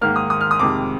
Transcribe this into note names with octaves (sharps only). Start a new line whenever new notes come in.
G#2 D#3 A#3 F6
D#6
D#6
F6
D#6
F2 C3 D#3 G#3 D6